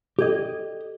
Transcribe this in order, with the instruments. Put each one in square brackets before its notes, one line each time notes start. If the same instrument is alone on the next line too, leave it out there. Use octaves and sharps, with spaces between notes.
[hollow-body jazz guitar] G4 D#5 [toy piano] A4 D5